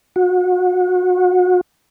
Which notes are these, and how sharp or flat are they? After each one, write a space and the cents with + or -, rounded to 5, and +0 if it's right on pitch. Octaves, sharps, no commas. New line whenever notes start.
F#4 -30